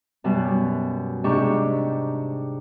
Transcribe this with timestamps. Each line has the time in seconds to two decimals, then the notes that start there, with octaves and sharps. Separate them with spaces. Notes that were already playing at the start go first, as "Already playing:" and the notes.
0.24 F#2 B2 G3
1.24 G#2 C3 D4 G4 C#6